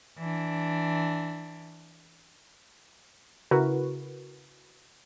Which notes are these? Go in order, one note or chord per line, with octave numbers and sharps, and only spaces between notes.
E3 D4
C#3 E4 F#4 A#4 B4